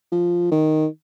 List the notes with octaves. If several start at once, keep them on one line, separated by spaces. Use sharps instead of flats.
F3
D#3